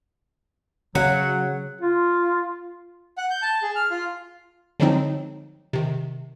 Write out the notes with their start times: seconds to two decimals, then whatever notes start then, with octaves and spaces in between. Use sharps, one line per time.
0.95 C#3 F#3 F#5
1.81 F4
3.18 F#5
3.30 G6
3.42 A5
3.62 G#4
3.75 F6
3.91 F4
4.80 D3 F3 F#3 G#3 C4 D#4
5.73 C3 D#3